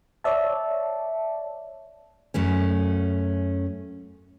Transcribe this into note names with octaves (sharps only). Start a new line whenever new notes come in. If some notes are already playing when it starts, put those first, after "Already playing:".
C#5 D5 E5 A5
F#2 A3 C#4